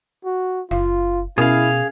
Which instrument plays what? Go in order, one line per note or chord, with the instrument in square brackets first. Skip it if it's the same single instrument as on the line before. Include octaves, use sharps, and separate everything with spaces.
[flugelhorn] F#4
[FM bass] F#1 [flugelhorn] F4 [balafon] F5
[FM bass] B2 [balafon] C#4 A#4 [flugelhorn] E4 [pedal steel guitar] G#4 F5